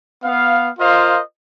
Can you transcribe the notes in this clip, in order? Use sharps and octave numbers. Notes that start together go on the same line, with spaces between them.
B3 F5
F4 A#4 C5 D#5 F5